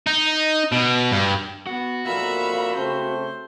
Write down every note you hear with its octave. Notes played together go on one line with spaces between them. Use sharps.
D#4
B2
G2
B3 F#4
F2 A#2 A#3 E5 F5 B5
C#3 A3 C4 C5